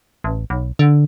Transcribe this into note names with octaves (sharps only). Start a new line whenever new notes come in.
A1
B1
D3